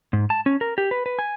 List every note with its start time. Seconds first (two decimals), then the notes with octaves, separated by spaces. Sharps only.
0.13 G#2
0.30 A5
0.46 C#4
0.61 A#4
0.78 G4
0.91 B4
1.06 B4
1.19 G#5